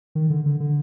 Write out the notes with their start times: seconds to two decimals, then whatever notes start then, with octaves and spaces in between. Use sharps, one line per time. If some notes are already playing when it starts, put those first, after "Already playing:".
0.15 D#3
0.30 D3
0.46 D3
0.60 D3